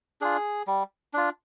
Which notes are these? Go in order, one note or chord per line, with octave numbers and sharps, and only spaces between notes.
D4 F4 G#4
G3
D4 F4